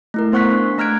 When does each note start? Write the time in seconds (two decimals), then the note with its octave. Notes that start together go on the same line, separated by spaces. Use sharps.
0.14 A3 E4 A#4
0.32 B3 C5 F#5 C#6 F#6 B6
0.51 D4
0.78 A3 A#5 F6 F#6 G#6 D7